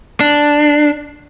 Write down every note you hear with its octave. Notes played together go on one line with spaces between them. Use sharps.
D4